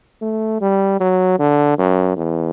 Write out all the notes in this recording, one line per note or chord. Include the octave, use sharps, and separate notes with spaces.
A3
G3
F#3
D3
F#2
E2